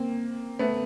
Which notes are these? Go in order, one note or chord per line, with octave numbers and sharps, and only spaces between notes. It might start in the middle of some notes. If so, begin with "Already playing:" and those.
Already playing: A#3 C4
A3 B3